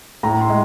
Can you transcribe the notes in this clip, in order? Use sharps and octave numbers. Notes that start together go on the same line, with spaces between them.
A2 A#5
C6
G#3